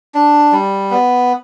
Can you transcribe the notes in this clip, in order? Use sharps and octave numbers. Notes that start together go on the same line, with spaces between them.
D4
G3
B3